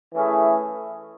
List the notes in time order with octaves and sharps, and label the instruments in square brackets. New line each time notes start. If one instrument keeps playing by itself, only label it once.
[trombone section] E3 A3 C#4 E4 G#4